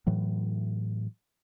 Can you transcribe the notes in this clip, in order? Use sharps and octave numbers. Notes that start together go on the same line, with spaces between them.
A2 E3 F#3